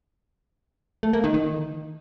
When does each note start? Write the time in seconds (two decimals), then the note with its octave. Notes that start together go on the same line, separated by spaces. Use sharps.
1.03 A3
1.13 A#3
1.24 D#3
1.34 D#3